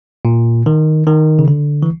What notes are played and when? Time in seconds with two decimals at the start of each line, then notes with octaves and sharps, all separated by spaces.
0.25 A#2
0.66 D#3
1.07 D#3
1.39 C#3
1.48 D3
1.83 E3